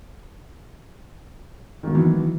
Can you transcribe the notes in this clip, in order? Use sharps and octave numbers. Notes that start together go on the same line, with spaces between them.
B2 D#3 E3 F#3